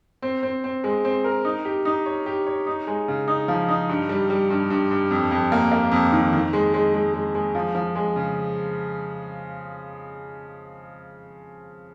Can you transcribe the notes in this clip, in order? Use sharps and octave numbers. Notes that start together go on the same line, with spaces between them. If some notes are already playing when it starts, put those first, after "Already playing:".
C4
C4
C4
G#3
C4
A#4
D#4
G4
D#4
C#5
G4
C#5
D#4
G#3
C#3
D#4
F3
D#4
G2
G3
G3
G2
G2
G2
F2
F2
A#3
A#3
F2
D#3
D#3
G#3
G#3
G#3
G#3
G#3
F3
F3
G#3
C#3